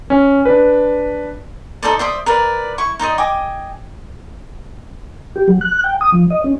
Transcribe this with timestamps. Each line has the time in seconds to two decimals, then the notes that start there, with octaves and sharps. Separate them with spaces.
0.10 C#4
0.45 D4 B4
1.83 D#4 A4 C5 D5
1.99 C5 D5 E5 D#6
2.26 A#4 B4 D5
2.78 E4 C#6
2.99 D#4 C5 D5 D#5
3.18 D#5 G5 G#5 D6
5.36 G4
5.48 F#3
5.61 F#6
5.84 G5
6.01 D#6
6.12 F3
6.30 D#5
6.44 C#4